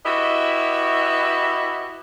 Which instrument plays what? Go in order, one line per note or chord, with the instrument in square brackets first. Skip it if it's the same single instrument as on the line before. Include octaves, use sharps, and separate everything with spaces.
[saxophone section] E4 F#4 G4 B4 D#5 E5